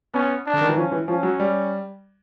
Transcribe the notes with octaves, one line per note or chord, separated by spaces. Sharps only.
B3 C#4
D4
D3
D#3
E3
F3 C#4
E3
F3 C#4
F#3
G3